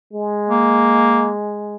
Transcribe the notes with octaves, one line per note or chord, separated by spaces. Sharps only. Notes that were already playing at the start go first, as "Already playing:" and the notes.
G#3
A#3